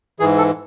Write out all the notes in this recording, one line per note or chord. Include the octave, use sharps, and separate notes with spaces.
G#2 E3 G#4
A4